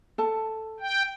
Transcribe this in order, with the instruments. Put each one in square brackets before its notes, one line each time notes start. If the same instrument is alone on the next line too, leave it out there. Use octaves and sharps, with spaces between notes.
[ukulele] A4 A5
[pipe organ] G5